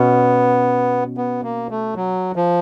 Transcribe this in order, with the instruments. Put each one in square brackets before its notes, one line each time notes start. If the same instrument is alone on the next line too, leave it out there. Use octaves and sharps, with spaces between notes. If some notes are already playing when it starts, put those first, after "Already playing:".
Already playing: [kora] B2 C#4 [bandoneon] B3
[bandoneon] B3
A#3
A3
F#3
F3